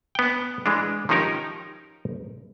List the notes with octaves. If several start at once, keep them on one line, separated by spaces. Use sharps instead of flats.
B3 G5
E3 G#3 D4
D#3 F3 C#4 D#4 G4 A#4